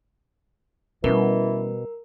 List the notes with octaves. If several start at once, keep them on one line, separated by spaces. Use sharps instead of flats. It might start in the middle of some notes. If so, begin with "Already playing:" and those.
B2 E3 G3 C#4 A#4